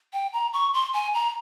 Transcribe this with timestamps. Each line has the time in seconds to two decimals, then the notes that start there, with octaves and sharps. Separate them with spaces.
0.13 G5
0.33 A#5
0.53 C#6
0.74 C6
0.94 G#5
1.14 A#5